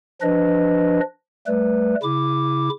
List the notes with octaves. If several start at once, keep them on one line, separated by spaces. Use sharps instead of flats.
F3 D4 B4 D#5
G3 A3 B4
C#3 E4 D6